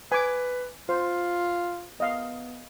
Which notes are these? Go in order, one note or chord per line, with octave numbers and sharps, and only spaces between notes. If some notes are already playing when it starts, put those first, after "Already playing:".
B4 G#5 D6
F4 C5
B3 D#5 F5